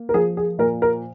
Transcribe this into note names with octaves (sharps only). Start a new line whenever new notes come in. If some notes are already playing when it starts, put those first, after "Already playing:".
Already playing: A#3
A#4
F3 G#4
G#4
A#2 A#4
A#4